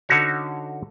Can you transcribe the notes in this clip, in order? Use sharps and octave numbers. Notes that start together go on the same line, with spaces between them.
D3 C#4 D#4 F#4 C#5